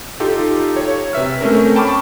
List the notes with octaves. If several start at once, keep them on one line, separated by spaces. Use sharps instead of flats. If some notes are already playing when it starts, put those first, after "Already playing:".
D#4 F4 G4 A4
C#5
C3 B4 E5 F6
A3 C4 C#4 A#4
G5 A5 B5 C#6 D6 F6